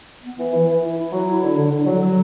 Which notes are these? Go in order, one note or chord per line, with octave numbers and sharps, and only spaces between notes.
B3
E3
E3
E3
E4
E4
F#3
E4
D3
D3
D3
F#3
F#3